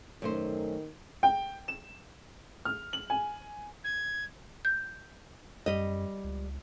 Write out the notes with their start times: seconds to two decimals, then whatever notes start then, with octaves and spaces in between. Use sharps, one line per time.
0.22 F#2 D#3 A3 C5
1.23 G5
1.68 E7
2.65 F6
2.93 F#7
3.10 G#5
3.84 G#6
4.65 G6
5.66 F#2 G3 D#5
6.24 C#2